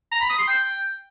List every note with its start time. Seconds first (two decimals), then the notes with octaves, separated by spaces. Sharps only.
0.11 A#5
0.20 B5
0.29 D#6
0.38 C6
0.47 G5